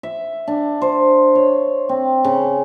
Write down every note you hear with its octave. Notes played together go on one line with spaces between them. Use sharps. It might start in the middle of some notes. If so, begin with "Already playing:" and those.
E5
D4
C5
C#5
C4
C#3